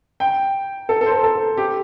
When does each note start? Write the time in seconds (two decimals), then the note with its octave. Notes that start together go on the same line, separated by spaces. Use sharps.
0.20 G5
0.89 A4
1.01 A4
1.06 C5
1.12 A4
1.23 A4
1.57 G4